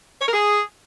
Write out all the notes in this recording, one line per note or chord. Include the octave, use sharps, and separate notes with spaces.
C#5
A#4
G#4